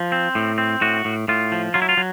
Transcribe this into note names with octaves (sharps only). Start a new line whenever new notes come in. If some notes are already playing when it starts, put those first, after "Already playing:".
Already playing: F3
C4
A2
C4
A2 F#4
A2
A2 F4
F3
F#3 F4
E4
F4
F#3